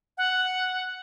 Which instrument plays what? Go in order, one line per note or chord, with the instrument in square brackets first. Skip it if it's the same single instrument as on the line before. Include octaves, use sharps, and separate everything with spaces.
[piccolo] F#5